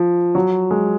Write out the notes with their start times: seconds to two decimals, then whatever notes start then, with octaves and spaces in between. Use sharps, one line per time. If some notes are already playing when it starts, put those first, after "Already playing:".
Already playing: F3
0.35 F#3
0.71 G#3